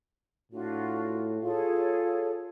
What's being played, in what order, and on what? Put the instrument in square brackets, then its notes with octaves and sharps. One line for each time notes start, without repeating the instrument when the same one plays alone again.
[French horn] A2 [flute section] D4 F4 F#4
[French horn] F4 [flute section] G#4 A4 C#5